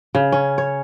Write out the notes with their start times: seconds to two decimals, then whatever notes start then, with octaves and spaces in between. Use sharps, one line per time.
0.15 C#3
0.32 C#4
0.58 C#5